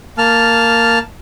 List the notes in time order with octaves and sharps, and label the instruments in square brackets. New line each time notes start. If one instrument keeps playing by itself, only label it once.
[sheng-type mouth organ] A#3 A5 F6